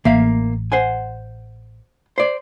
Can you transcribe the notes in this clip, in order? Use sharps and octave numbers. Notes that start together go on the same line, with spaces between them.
A1 A#3 E5 F5
C5 F#5 G#5
C5 D5